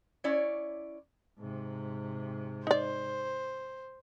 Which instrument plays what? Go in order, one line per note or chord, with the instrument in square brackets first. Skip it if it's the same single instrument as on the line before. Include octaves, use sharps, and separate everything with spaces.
[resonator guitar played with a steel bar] C#4 E4 C#5 D5
[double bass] G#2 C3
[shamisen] D#4 D5 [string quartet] C5